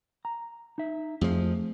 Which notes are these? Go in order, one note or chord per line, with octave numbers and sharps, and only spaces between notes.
A#5
D#4 E5
F2 F3 A3 G#4